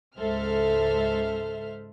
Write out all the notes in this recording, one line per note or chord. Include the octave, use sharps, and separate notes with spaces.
C#2 G#2 A4 C5 E5 F6